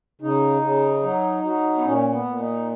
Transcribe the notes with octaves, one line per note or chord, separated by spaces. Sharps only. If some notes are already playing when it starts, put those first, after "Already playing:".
C#3 D#4
C#3
F#3
F#3
B3
A#2 C#4
B3
A#2
D#4